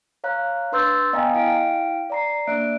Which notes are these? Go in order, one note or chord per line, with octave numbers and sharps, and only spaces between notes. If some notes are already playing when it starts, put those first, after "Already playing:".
C#5 F5 A#5 F#6
D4 B4 C6 E6 G6 A6
B3 D#5 F5 G5 G#5 A#5
E4 F5 G5 D7
D5 A#5 C7
A#3 D4 D5 E5 F#6 D7